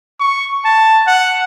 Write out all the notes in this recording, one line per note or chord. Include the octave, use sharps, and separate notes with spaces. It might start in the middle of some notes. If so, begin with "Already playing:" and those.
C#6
A5
F#5